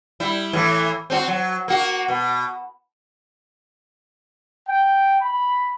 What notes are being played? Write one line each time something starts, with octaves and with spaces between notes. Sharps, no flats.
G3 E4
A2 E3
C4 C#4 F#4
F#3
A#3 F#4
B2
G5
B5